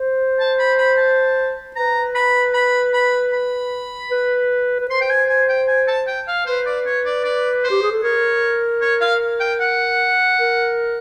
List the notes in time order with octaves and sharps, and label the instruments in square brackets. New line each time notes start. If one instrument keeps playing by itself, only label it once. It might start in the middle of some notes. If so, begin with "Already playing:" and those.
Already playing: [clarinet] C5
[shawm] A5
B5
B5
A5
[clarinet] B4 [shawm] A#5
[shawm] B5
B5
B5
B5
[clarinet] B4
B4
[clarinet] C5 [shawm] C6
[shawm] G5
G#5
G#5
G5
G#5
A5
G5
F5
[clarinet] B4 [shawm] C5
[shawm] D5
C#5
D5
D5
C5
[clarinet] G4
G#4
A4
[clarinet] A#4 [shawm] C#5
[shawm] C#5
F5
G5
F#5
[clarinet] A#4